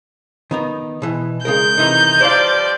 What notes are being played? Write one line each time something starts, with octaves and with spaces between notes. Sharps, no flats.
D#3 B3 D#4
B2 E3
C#3 G#3 A#4 G6
C3 D#3 E3 D#4
G2 F3 C5 D5 F5